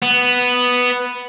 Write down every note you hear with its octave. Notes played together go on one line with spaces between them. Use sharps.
B3